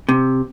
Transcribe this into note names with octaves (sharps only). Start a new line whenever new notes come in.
C3